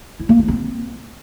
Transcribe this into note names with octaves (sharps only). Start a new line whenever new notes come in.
E4
A#3
F4
C4